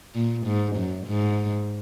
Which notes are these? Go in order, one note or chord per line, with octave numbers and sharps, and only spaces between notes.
A#2
G#2
F#2
G#2